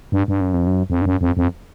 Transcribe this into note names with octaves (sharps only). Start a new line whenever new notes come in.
G2
G2
F#2
F2
F#2
F2
G2
F#2
F2
F2